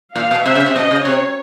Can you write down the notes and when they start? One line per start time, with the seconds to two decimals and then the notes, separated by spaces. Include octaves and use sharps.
0.16 A#2 F5
0.31 B2
0.46 C3 E5
0.55 C#3
0.66 C3
0.76 B2 D#5
0.91 C#3
1.05 C3 C#5